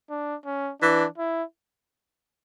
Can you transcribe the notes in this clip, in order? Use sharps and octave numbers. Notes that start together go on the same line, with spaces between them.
D4
C#4
E3 D4
E4